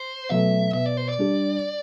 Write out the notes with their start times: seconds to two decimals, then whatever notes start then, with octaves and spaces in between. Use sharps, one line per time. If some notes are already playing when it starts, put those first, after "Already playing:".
Already playing: C5
0.29 B2 F#3 A3 E5
0.74 B2 E5
0.86 D5
0.97 C5
1.09 D5
1.19 G3 D4 G4